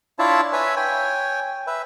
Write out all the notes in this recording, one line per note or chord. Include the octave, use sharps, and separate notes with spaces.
D4 E4 F4 C#5 E5 A5
B4 C#5 E5 G#5
C#5 G5 G#5
B4 E5